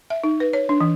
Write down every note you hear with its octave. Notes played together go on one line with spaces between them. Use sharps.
E5
D#4
B4
C#5
D4
E3